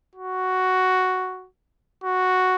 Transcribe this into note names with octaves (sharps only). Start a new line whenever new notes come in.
F#4
F#4